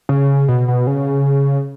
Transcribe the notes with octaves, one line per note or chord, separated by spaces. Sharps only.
C#3
B2
B2
C#3